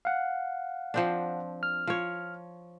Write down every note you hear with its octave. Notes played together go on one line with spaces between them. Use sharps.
F5 F#5
F3 C4 D4
F6
F3 C#5